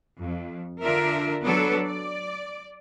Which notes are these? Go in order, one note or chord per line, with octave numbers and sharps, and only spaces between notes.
F2
D3 D4 F4 A#4 E5
F#3 B3 D4 A4 B4
D5